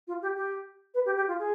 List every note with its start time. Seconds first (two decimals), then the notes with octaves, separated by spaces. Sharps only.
0.08 F4
0.22 G4
0.37 G4
0.94 B4
1.06 G4
1.17 G4
1.28 F4
1.39 G#4